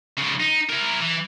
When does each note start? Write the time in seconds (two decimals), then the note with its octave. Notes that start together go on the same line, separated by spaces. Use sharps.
0.18 C#3 F3
0.40 D#4
0.69 E4 A#4
1.01 E3